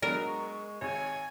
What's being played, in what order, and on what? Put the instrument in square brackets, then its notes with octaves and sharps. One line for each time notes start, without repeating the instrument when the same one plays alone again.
[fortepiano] F#3 B3 D4 [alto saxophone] G#3 [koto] A#4
[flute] C#6
[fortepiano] G#1 [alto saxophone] C#5 [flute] G#5